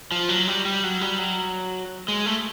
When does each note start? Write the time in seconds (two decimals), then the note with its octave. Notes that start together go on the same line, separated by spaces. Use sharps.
0.11 F3
0.29 F#3
0.48 G3
0.65 G3
0.84 F#3
1.01 G3
1.19 F#3
2.08 G#3
2.26 A3